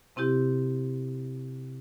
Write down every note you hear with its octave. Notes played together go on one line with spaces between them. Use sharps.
C3 C4 E4 G4